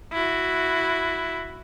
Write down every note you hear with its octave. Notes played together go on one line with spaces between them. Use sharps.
E4 F#4